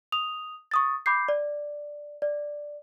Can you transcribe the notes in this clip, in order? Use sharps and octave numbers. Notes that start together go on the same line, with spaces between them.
D#6 F7
C#6 D#6 A6
B5 D6 G6 C7
D5
D5